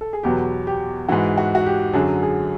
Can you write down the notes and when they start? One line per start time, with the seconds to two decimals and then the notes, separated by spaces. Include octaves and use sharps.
0.01 A4
0.13 G#4
0.23 E2 B2 F#3 G4
0.67 G4
1.09 G#2 E3 F#4
1.38 F#4
1.55 F#4
1.66 G4
1.93 F#2 D3 F#3 G#4
2.23 G#4